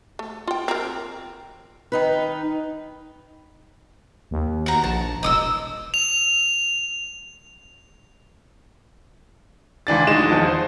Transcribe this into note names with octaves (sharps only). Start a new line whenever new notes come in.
A3
F4 G5
C4 A#4
D#3 D#4 B4
D#2
F#4 A#5
A#1 A5
E1 D#5 D#6 E6
F7
C#2 E3 D4 A6
D1 G#3 D#4 E7
E2 F3 A5
C5